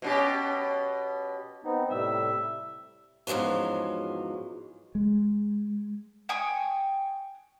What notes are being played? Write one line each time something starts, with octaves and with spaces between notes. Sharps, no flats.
B2 C#4 G4
B3 C4 D#4
A2 C3 G3 E5
E2 G#2 F3 F#3 C#4
G#3
G5 G#5 C#6 D#6